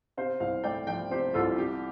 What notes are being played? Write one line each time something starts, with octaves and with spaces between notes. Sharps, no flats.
C3 C5 F5
C2 C5 F5
A3 D5 G5
F3 D5 G5
C3 G4 C5
C2 F4 A4
C3 G4